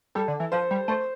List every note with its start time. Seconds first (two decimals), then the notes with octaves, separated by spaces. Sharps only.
0.15 G3 A4
0.28 D3
0.40 E3
0.52 F3 C5
0.71 G3
0.88 A3 C5